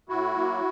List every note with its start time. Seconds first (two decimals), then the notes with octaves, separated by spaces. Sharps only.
0.09 A2 E4 F#4
0.35 F#3 A#3